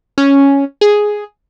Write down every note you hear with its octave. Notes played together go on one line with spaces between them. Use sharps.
C#4
G#4